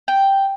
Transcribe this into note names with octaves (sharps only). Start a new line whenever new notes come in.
G5